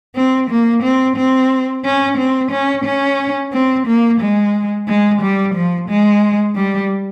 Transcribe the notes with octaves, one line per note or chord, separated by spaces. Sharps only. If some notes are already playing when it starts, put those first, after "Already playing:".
C4
A#3
C4
C4
C#4
C4
C#4
C#4
C4
A#3
G#3
G#3
G3
F3
G#3
G3